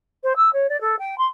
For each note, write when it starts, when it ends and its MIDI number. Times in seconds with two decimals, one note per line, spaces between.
0.24 0.33 72
0.37 0.50 88
0.53 0.67 73
0.69 0.80 74
0.81 0.96 69
0.99 1.18 79
1.18 1.27 84